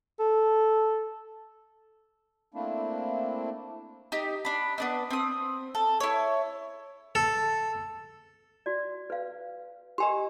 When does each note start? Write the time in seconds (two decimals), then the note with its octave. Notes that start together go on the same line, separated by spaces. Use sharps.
0.20 A4
2.54 A3 A#3 C4 D4 E4
4.12 D#4 G4
4.45 D4 B5
4.78 B3 D4 D#4
5.10 C4 D#6
5.75 A4
6.00 E4 C#5
7.15 A4
8.66 F#4 D5
9.10 B4 F5
9.98 G4 A#4 D#5 G#5 C6